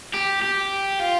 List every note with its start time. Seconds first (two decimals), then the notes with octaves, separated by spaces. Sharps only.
0.14 G4
0.42 G4
1.00 F4